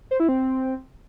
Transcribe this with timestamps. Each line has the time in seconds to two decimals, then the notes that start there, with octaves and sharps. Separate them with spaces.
0.11 C5
0.20 E4
0.28 C4